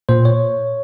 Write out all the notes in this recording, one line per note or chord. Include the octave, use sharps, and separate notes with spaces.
A#2 C5
C#5